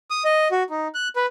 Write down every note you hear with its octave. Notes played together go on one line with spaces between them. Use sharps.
D#6
D#5
F#4
D#4
F#6
B4